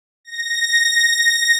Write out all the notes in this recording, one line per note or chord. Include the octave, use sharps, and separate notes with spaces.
A#6